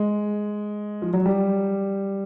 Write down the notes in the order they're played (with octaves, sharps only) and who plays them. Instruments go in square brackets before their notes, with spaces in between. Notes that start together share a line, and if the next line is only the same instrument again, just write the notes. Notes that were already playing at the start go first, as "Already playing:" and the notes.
Already playing: [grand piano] G#3
F3
F#3
G3